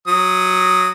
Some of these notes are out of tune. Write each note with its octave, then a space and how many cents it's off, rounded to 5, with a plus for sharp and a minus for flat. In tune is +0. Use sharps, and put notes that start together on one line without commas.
F#3 +0 D#6 +0